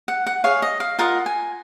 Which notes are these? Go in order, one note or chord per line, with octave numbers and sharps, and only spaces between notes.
F#5
F#5
G#4 C#5 F5
D#5
F5
F4 A#4 D#5 F#5
G#5